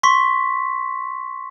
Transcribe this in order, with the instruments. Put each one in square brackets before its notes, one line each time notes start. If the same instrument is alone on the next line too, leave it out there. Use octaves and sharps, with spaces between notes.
[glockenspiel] C6 C#6 B6